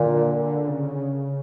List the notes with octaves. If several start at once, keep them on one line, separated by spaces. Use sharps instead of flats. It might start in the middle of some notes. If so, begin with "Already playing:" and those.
Already playing: A#2 D3
C#3